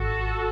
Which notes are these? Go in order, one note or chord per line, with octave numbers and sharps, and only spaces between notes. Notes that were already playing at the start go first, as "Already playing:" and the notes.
Already playing: G#1 F#4 A4